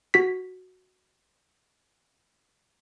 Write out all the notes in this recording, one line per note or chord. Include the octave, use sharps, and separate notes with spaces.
F#4 B6